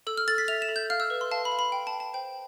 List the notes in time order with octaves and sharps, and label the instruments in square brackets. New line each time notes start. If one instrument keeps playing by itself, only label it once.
[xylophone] A4 E6
F6
A4 A6
B6
E5 F7
E7
A4
G6
F5 F6
E6
B4
C6
F5 A5
B5
F5
B5
G5
A5
G5
A5
C5 G5